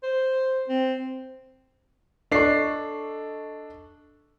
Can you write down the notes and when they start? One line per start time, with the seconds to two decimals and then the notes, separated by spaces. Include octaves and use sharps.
0.03 C5
0.69 C4
2.32 D4 A4 D#5 C#6 C7